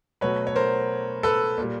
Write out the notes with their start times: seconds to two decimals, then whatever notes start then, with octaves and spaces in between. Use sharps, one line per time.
0.21 B2 F#3 A3 B4 C#5
0.47 C#5
0.56 A#4 C5
1.23 A4 B4
1.58 A#2 G3